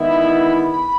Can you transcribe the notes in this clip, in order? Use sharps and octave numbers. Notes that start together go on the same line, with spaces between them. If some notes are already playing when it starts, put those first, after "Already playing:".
Already playing: D#3 G#3 B3 E4
B5
B5
B5